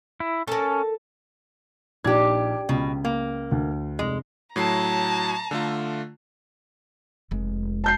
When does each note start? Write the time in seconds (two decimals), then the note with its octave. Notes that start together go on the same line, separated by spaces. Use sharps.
0.20 E4
0.47 C#4 A4 A#4
2.04 A#1 D4 D#4 G4 G#6
2.69 C#2 B2
3.05 A#3
3.51 D2
3.99 F1 G#3
4.56 A2 F#3 A5 A#5 C7
5.51 D3 A3 F4
7.31 F1 G#3
7.84 A5 G6 C7